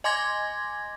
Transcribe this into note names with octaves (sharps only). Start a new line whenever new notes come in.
D#5 G#5 C6 D6 G#6 A#6